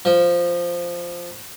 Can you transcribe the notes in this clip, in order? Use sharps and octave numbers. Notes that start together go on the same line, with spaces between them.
F3